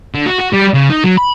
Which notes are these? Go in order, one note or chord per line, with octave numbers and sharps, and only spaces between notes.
D3
F#4
F#4
G3
C#3
D#4
F#3
B5